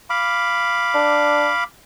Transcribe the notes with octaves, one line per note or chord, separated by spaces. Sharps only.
F5 B5 D6
D4